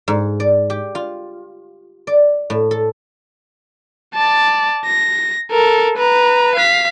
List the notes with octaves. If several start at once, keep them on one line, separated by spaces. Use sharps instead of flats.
G#2
D5
G4
F4
D5
A2
A4
D5 A5
A#6
A4 A#4
B4 A#5
F5 B6